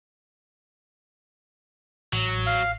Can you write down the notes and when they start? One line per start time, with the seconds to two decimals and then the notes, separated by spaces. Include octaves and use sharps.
2.13 A1 F#3
2.47 F5